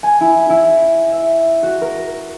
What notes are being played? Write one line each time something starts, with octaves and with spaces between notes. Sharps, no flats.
G#5
E4
E4
E5
F#4
A#4